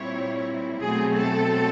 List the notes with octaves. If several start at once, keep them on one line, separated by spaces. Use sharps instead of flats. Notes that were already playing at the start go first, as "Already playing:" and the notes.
Already playing: A#2 G3 C4 E4 C#5
B2 F#3 A3 C4 G#4
A4